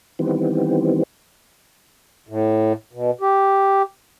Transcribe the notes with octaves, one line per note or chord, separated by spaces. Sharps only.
D#3 E3 G3 B3 C4
A2
B2
G4